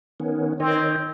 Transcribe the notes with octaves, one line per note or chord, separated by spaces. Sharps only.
D#3 B3 C#4
D#3 C4 C#5 D#5